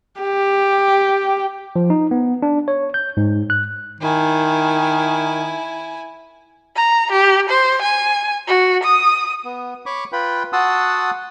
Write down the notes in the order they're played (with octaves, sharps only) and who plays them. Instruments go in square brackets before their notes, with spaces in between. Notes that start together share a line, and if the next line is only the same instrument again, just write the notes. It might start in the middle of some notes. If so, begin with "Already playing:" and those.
[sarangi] G4
[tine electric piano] F3
D#4
B3
D4
C#5
G6
G#2
F#6
[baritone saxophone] D#3 [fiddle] E4 G#5
[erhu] A#5
G4
C5
G#5
F#4
D#6
[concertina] B3
C#5 B5 C#6 D6
F4 B4 G5 B5
F#4 F#5 A5 C6 D#6 E6